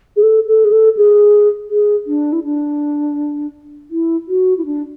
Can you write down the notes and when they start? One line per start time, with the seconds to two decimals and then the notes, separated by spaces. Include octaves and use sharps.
0.16 G#4
0.23 A4
0.48 A4
0.65 G#4
0.72 A4
0.97 G#4
1.70 G#4
2.07 D4
2.33 E4
2.44 D4
3.91 E4
4.28 F#4
4.58 E4
4.66 D4